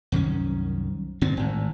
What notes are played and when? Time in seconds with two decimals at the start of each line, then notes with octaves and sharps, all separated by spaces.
0.12 C2 F#2 D#3 C#4
1.21 G1 A#2 C4
1.37 G#1 A2